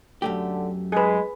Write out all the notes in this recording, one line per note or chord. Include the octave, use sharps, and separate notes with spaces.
F#2 D3 A3 G4
G#3 G#4 B4